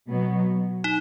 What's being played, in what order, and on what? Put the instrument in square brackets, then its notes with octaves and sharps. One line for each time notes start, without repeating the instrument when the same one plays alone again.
[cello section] B2 F#3 B3
[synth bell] D#4